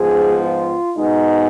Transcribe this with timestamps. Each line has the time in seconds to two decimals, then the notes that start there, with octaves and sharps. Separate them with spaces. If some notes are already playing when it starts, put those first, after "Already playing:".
Already playing: G#2 F3 B3 G#4
0.44 F4
0.97 B2 G#3 B3 D#4